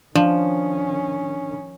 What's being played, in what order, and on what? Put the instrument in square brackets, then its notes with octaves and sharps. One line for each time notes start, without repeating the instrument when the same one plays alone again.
[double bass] D#3 C#4 [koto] F3 [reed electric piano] D4